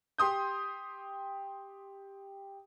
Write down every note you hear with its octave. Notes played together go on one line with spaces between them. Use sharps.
G4 C6 D#6 G6